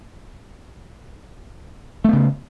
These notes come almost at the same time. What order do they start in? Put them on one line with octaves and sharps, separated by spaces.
A3 B3 C#3